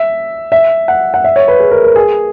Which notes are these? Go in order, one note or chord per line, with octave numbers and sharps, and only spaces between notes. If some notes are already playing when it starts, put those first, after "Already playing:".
Already playing: E5
E5
F#5
F#5
E5
C#5
B4
G#4
A#4
A#4
G#4